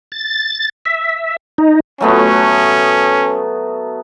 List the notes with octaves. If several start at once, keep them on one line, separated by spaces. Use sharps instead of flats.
A6
E5
D#4
F#3 A3 B3 C#4